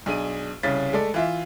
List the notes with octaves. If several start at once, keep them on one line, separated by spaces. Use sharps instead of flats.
B1 D4 G#4 D#7
C2 C#3 C#4 A6 B6
G#3 A3 A4 D5
E3 F4 E5